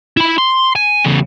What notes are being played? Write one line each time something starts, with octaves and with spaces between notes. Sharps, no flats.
E4 B5
C6
G#5
E2 C#3